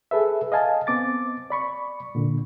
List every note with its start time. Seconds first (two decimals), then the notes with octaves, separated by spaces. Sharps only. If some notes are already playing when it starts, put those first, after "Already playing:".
0.11 G#4 A4 B4 E5
0.52 D#5 F5 G#5 A5
0.87 B3 C4 D6 A6
1.50 D5 B5 C#6
2.15 A#2 D3